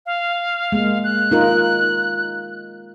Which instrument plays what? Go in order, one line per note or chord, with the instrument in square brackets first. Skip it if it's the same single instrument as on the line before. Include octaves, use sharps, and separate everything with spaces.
[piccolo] F5
[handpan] G#3 A#3
[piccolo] F#6
[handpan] D#4 F4 A#4